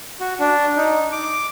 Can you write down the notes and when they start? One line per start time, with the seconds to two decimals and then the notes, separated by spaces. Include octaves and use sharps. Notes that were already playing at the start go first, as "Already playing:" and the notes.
0.20 F#4
0.40 D4
0.77 D#4
1.12 D6